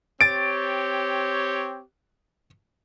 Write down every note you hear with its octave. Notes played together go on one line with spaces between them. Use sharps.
C4 G4 C#5 A6 D7